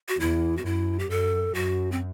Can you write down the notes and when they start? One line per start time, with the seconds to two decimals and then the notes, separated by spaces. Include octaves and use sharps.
0.08 F#4
0.19 E2 E4
0.57 F#4
0.65 F#2 E4
0.99 G4
1.09 F#2 A4
1.54 F#2 F#4
1.92 C4